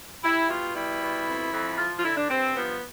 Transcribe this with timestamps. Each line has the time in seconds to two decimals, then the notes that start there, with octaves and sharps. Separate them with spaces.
0.23 G3 E4
0.49 B2 F4
0.74 G3 E4
1.01 B2
1.27 F2
1.52 F2
1.78 F3 F4
1.99 F4
2.04 D3 E4
2.17 D4
2.30 G2 C4
2.56 F3 B3